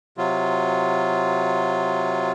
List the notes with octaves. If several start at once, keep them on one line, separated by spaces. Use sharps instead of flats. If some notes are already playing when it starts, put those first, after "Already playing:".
C3 F#3 F4